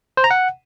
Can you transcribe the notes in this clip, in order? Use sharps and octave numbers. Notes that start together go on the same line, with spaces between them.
C5
A#5
F#5